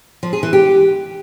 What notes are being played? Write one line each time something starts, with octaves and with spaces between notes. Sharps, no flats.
F3
G#4
E3
G4